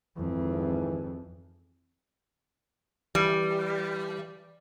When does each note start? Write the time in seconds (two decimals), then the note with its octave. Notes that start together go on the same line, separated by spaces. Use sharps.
0.17 G#1 F2 E3
3.15 E3 G3